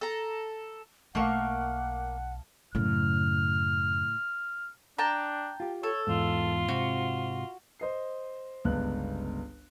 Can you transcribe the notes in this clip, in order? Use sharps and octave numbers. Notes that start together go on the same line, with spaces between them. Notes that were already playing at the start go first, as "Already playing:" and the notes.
A4 A#5
B1 A3 A#3 F5 F#5 C#6
F#2 A2 C#3 F6
D4 G5 A5 A#5
F4 G4
A4 C#5
E2 G#2 F4
G#2 C3 C4 F#4
C5 D#5 C7
G1 C#2 B3 F#6